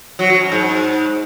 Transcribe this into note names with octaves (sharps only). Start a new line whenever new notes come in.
F#3
F#3
F#2
G#2